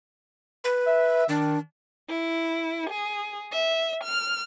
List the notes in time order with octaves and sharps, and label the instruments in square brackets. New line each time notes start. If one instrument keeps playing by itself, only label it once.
[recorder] B4
[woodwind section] E5
[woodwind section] D#3 [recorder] D4
[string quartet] E4
G#4
E5
F6